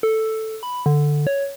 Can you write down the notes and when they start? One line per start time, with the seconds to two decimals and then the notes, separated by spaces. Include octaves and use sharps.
0.03 A4
0.63 B5
0.86 D3
1.27 C#5